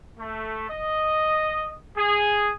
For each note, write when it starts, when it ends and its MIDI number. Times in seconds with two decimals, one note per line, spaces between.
0.20 0.69 57
0.69 1.76 75
1.98 2.53 68